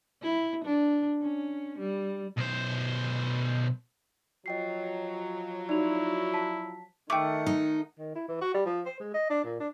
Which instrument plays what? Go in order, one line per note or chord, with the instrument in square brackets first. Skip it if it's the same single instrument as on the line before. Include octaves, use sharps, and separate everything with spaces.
[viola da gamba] E4
D4
C#4
G3
[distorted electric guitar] B1 C5
[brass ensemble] F3 F#3 [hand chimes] D#5 G5 C7
[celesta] D#4 F7 [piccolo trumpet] E4 [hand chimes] F#4 D5
[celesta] A5 B6
[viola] D#3 F#5 [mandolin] A3 [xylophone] G5 D6
[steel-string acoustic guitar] D#4
[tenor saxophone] D#3
E4
E3
F#4
G3
F3
C5
G#3
D#5
D4
A#2
D4